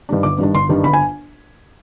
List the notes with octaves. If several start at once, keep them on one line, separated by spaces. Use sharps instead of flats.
G2 D#3 G3 D4
G1 D6
G2 D#3 G3 D4
G1 C6
G2 D#3 G3 D4
G1 B5
G#5